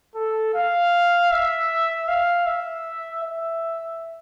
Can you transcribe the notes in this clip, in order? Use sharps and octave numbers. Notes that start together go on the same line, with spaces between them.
A4
F5
E5
F5
E5
E5